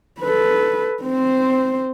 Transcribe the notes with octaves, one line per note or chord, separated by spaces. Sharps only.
A4 B4
C4 C5